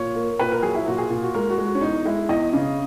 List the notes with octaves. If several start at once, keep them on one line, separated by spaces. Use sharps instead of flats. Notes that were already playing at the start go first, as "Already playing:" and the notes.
Already playing: A#2 C#5
A#3
A#2 B4
A#4
F#3 G#4
E4
A#2 F#4
G#4
A#2
F#4
G#3 A#4
F#4
G#3
F#4
C#4
E2 D#4
G#3 E4
E2 D#5
C#3